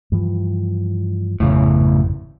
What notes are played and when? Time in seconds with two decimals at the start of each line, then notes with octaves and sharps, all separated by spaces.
0.12 G2 E3 F3
1.40 G#1 F2 A2 C#3